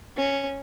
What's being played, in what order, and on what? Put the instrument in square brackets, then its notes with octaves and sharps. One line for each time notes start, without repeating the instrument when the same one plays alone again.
[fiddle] C#4